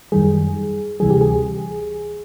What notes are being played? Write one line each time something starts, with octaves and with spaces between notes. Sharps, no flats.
F#2 D#3 G3 G#4
D2 C3 E3 G3 G#4
G4
G#4